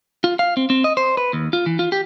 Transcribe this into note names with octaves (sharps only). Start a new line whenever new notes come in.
F4
F5
C4
C4
D#5
C5
B4
D#2
F4
E3
F4
G4